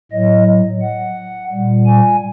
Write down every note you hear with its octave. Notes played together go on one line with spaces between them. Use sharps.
A2 F#3 D#5
F#5
A#2 G3
G#5